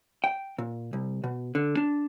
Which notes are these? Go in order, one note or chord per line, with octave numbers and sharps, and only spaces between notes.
G5
A#2
C2
B2
D3
D4